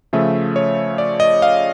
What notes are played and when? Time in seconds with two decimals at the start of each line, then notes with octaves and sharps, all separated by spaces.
0.13 C#3 F3 A3 E5
0.56 C#5
0.98 D5
1.20 D#5
1.42 F5